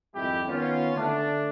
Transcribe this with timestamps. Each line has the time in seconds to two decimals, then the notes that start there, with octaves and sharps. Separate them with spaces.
0.15 G#1 F2 G3 G#3 E4 G4
0.47 D#3 B3 C#4 F4
0.96 D3 A3 D4